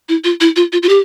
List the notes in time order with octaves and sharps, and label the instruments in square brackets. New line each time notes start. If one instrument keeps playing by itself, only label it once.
[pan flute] E4
F4
E4
F4
F4
F4
G4